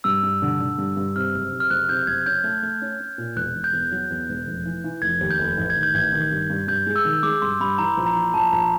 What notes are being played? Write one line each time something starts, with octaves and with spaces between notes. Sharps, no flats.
G2 E6
G2
D3
D3
G2
G2
C3 F6
F#1
C3
F6
F#1 F#6
C3 G6
F#1 G#6
C#4 G6
A3
A3
C#4
C#4
A#2
E1 F#6
E1
G6
E2
F#3
E2
E1
F1
E3
E3
F1 G#6
D#2
G6
F1
A1
G#6
D#3
G6
A1 G#6
D#3
G2
G2
G2 G6
G#3
E6
D#3
G#3 D6
G2 C6
G2 B5
E3 A#5
A#1
A#5
E3
A#1 A5
A#1 A#5